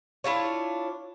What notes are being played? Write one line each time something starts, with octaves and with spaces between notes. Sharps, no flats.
D4 E4 F4 C#5